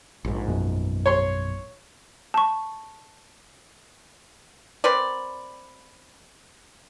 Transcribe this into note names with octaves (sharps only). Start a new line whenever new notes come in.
A#1 G#2
F#2 B2
C#5 C6
A5 C#6
C4 A#4 B4 D5